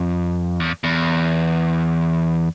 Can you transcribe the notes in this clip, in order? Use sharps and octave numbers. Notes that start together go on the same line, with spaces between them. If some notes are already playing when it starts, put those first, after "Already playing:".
Already playing: F2
E2
E2